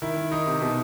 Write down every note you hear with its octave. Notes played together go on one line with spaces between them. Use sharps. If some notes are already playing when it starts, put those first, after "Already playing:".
D#3 E4
D#3
D#3 D#4
C3
B2